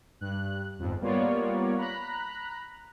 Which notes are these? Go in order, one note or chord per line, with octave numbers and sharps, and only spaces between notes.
G2 F#6
G1 F2 G#2
G3 A#3 B3 F4 C#5 D5
A#5 B5 F#6